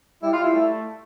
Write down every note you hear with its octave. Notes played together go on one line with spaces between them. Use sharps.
G3 E4
F4
E4
A3